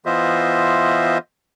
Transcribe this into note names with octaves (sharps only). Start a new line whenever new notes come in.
E3 B3 F4 C5 D#5 E5